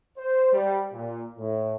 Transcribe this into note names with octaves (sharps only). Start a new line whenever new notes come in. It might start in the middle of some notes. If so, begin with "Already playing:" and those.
C5
G3
A#2
A2